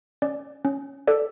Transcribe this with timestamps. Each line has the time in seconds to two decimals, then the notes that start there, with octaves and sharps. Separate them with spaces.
0.22 C#4 D5
0.65 C#4
1.07 A4 D5